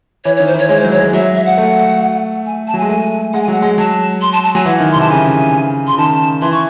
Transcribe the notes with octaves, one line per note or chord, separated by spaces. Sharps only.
E3 C#5
C#5
D#3
C5
E3 C#5
G#3 C#5
F#3 C5
C#5
G#3
F#3 E5
E5
F#5
A3
G#5
A5
F#3
G#5
G#3
A3 G#5
G#3 F#5
G#5
F#3 F#5
G#3
F#3 A5
C6
A5
A5
F#3 G#5
E3 F#5
D#3
C6
C3
A5
C#3 G#5
C6
C#3
D#3 A5
E3 C6
C#6